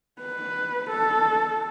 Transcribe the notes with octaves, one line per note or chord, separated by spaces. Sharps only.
B4
A4